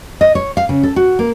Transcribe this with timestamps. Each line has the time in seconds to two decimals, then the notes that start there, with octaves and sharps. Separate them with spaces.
0.21 D#5
0.35 C#5
0.57 F5
0.69 C#3
0.83 A4
0.96 F#4
1.19 A#3